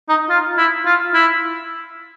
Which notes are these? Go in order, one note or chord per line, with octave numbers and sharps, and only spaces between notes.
D#4
F4
E4
F4
E4